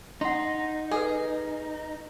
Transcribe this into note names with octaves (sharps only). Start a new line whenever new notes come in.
D#4 F#5 C6
G#4 A4 B4